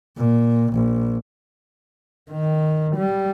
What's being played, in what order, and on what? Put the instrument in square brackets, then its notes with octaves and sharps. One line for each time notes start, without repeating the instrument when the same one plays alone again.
[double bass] A#2
A#1
D#3
G3